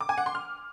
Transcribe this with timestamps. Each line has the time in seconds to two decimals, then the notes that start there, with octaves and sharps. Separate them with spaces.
0.01 D6
0.09 G#5
0.18 F#5
0.26 C6
0.35 F6